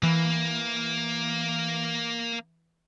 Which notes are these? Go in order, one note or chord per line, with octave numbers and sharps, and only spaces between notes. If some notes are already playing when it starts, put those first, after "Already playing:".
E3 A#3